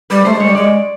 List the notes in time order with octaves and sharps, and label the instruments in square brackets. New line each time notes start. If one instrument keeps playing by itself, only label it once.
[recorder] G3 [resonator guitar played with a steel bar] B4
[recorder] A3 [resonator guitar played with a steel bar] C5
[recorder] G#3
[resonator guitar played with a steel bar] C#5
[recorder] G3
[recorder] G#3 [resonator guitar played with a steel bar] D5